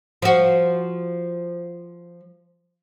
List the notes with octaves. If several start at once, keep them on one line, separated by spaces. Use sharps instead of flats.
F3 F#4